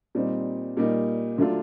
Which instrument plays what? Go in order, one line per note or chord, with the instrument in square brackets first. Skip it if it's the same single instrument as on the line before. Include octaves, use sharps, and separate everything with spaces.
[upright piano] A#2 G3 C4 D#4
A#2 G3 A#3 D#4
D3 F#3 A3 D4 F4